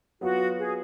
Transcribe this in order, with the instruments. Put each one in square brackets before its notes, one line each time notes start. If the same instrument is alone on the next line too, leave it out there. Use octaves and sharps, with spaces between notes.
[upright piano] F#3 B3 F4 [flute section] F#4
[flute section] G#4